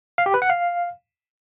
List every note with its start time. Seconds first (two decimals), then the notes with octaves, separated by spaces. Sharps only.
0.18 F5
0.26 G4
0.34 B4
0.42 F#5
0.50 F5